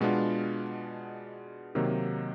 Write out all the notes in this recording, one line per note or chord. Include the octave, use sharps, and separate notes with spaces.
B2 G#3 B3 D4 F4
C3 D#3 F#3 A#3 D#4